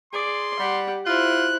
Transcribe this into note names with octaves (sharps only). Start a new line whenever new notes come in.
G#4 D5 C6
G3 G4 F#5
E4 F4 C5 F#6